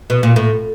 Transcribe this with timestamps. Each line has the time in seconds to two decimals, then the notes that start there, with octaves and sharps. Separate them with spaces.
0.10 B2
0.23 A#2
0.36 A2